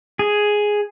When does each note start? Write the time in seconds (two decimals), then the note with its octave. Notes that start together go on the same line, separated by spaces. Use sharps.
0.19 G#4